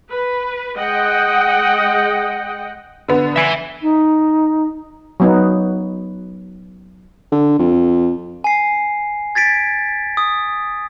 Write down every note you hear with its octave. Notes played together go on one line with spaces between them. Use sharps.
B4
G#3 D#5 F#5 G5
D3 B3
E5 G#5
D#4
F#3 B3 D#4
D3
F2
G#5 C7
G#6 A6 B6 D7
D#6